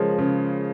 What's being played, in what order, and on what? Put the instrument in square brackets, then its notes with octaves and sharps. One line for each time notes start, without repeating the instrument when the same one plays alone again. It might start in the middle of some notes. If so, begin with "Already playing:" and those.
Already playing: [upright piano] C#3 F3 G#3 [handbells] A#4 C#5
[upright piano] C#3